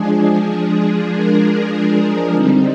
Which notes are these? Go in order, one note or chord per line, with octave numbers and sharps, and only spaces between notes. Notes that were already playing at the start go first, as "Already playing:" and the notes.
Already playing: F3 G#3 D4 G#4
A#4
D3 G3 C4 D#4